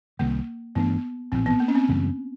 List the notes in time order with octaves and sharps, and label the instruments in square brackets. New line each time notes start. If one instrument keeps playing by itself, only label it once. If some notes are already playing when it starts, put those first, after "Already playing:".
[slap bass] C2 C3 D#3 G3 [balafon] A#3
[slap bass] G2 E3 A3 D4 [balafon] B3
[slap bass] A#1 A2 E3 [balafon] C4
[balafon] B3
A#3
C#4
C4
[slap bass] F#2 C#3 E3 G3